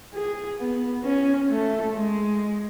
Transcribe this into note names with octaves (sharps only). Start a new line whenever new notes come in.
G#4
B3
C#4
A3
G#3